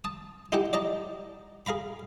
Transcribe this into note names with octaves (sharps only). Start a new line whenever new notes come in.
A5 D#6
D#4 E4 G4 F#5 G#5
D5 D#5 A5 A#5
G#4 F5 A#5 B5